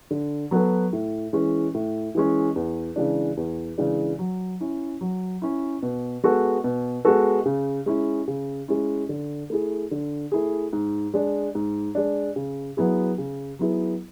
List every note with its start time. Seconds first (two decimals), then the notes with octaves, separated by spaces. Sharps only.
0.11 D3
0.51 F#3 B3 F#4 A4
0.93 A2
1.33 E3 G#3 C#4
1.74 A2
2.15 E3 G#3 C#4
2.56 E2
2.96 C#3 E3 G#3 D4
3.37 E2
3.78 C#3 E3 G#3 D4
4.19 F#3
4.60 C#4 E4
5.01 F#3
5.42 C#4 E4
5.83 B2
6.24 G#3 B3 F#4 A4
6.64 B2
7.05 G#3 B3 F#4 A4
7.46 C#3
7.86 G#3 C#4 E4
8.28 C#3
8.68 G#3 C#4 E4
9.09 D3
9.50 A3 E4 G#4
9.91 D3
10.32 A3 E4 G#4
10.73 G#2
11.14 G#3 D4
11.55 G#2
11.95 G#3 D4
12.36 C#3
12.77 F#3 B3 E4 G#4
13.18 C#3
13.59 F#3 B3 E4 G#4